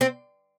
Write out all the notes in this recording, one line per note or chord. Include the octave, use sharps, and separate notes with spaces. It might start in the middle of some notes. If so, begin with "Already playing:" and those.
C4